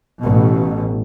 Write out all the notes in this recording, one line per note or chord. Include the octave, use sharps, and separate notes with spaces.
A1 B2